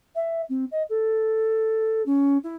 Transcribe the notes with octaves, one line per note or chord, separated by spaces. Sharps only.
E5
C4
D#5
A4
C#4
E4